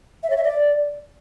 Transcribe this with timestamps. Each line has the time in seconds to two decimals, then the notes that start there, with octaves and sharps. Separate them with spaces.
0.23 E5
0.30 C#5
0.37 E5
0.44 D5